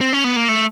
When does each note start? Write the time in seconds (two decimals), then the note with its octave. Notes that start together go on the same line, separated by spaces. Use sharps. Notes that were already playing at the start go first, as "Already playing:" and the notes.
0.01 C4
0.13 C#4
0.24 B3
0.36 A#3
0.49 A3